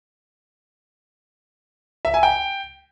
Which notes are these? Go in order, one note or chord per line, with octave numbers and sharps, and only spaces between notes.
E5
G#5
G5